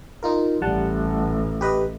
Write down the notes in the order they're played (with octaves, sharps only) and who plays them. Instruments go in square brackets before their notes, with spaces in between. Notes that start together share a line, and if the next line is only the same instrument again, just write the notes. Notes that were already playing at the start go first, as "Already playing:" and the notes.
[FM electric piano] D#4 F4 A#4
[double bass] A1 [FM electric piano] G3 F#5 A5
[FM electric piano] G4 B4 D#5